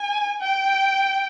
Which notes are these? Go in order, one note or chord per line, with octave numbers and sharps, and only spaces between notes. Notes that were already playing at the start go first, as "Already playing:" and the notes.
Already playing: G#5
G5